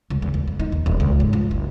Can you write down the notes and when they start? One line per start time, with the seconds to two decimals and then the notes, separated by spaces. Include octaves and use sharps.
0.10 C#2
0.22 E2
0.34 D#2
0.48 F2
0.60 D#4
0.72 D#2
0.86 D#1
1.00 C#2
1.20 G#2
1.33 F3
1.51 F#1